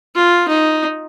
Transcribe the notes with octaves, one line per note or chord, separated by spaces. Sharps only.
F4
D#4